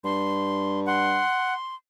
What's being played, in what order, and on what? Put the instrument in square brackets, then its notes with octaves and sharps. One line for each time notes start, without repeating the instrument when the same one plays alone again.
[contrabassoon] G2 [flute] C6
[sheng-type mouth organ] F#5 [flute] C6